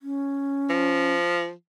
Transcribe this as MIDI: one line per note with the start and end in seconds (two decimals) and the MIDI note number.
0.02 1.13 61
0.70 1.52 53